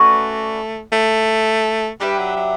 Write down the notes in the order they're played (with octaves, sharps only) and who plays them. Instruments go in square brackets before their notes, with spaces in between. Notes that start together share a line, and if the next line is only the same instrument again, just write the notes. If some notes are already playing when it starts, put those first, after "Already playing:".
Already playing: [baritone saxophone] A3 [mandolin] C#4 F#4 B4 D5
[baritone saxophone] A3
[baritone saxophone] G3 [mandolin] D4 G4 B4 E5
[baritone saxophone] F#3
F#3